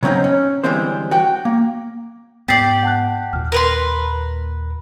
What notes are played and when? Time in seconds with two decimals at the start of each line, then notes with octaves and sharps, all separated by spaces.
0.03 C#3 F#3 C4 C#4 D#4
0.24 C#4
0.64 D3 E3 G3 G#3 C4 C5
1.11 F#4 G5
1.45 A#3
2.48 G#2 B3 G4 D5 G5 A6 C7
2.83 F#5 A5 F#6
3.33 D#2 A#2 F6
3.52 A#4 B4 C6